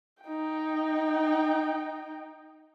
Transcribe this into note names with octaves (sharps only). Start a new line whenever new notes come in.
D#4 G5